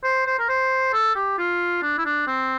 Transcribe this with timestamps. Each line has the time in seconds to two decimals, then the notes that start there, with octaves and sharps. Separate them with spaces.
0.03 C5
0.26 C5
0.39 A#4
0.49 C5
0.93 A4
1.15 G4
1.38 F4
1.82 D4
1.98 E4
2.05 D4
2.27 C4